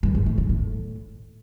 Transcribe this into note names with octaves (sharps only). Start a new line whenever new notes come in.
G2
G#2
A2
D3
A2